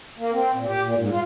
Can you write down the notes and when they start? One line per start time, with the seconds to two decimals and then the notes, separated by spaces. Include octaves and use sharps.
0.18 A#3
0.33 C4
0.54 A#2
0.67 G4
0.81 A#2
0.96 G#2
1.11 F4